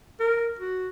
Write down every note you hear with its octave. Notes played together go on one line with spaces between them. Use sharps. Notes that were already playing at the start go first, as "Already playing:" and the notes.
A#4
F#4